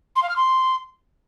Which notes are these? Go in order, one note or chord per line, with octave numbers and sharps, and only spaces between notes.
C6
F5
F6
C6